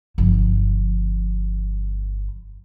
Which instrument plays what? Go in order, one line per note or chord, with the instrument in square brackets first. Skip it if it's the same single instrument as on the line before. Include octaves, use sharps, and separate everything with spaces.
[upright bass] G1 F3